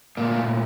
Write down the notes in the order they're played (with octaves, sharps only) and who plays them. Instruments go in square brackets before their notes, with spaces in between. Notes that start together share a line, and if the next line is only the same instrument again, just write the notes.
[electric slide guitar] A#2 A3 A#3